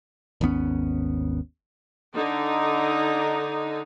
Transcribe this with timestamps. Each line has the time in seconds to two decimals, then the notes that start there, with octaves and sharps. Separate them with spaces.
0.41 G#1 D#2 B3 C#4
2.15 D3 D#4